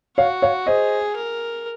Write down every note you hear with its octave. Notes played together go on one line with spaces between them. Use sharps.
F#4 C#5 F5
C#5 F5
G#4 C5 D#5
A#4